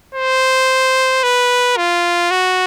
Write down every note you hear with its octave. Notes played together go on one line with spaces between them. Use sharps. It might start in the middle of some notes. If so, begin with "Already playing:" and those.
C5
B4
F4
F#4